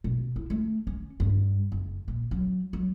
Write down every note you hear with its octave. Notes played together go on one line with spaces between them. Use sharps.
B2
E4
A3
C#4
G2
F#1
A#2
F#3
F#3